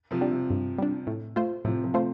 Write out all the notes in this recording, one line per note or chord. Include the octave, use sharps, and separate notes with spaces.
C3 F3
G3 D4
C3
G2
G3 D4
A2
A3 F4 C5
A2 C3 F3
C3 F3
A3 F4 C5